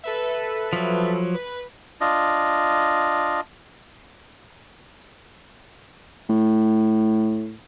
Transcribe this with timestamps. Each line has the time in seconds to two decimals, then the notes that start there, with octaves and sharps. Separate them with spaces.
0.03 A4 B4 E5
0.73 F3 F#3
1.34 B4
2.01 D4 F4 D#5
6.29 A2